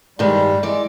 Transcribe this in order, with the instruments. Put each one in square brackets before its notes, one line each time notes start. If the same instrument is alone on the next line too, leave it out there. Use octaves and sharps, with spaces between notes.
[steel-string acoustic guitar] G2 D#3 G#3 [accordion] G3
[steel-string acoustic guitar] E3 D5 [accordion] G#3